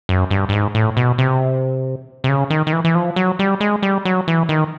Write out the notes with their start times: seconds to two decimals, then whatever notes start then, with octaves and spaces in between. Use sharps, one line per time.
0.09 F#2
0.31 G2
0.49 G2
0.52 G#2
0.75 A2
0.97 B2
1.18 C3
2.24 C3
2.29 C#3
2.50 D#3
2.67 D#3
2.73 E3
2.85 E3
2.95 F3
3.16 F#3
3.39 G3
3.61 G#3
3.83 G3
4.05 F#3
4.28 E3
4.49 D#3